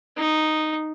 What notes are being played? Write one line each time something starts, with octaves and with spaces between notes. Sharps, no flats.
D#4